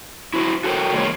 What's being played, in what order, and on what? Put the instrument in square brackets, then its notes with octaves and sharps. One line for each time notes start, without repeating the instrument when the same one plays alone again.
[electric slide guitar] E4 F#4 C5
F#4 A4 A#4 C5 C#5 G5
E2 G#3 A#3 C#5